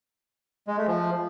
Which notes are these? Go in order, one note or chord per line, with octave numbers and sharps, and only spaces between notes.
G#3
A3
F3